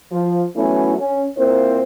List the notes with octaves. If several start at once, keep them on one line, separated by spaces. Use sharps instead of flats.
F3
E3 F#3 A3 B3 C#4 E4
C#4
A#2 A#3 C4 E4 C5